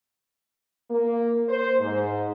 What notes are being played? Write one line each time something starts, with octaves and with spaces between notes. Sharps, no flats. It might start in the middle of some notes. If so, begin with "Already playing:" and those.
A#3
C5
G#2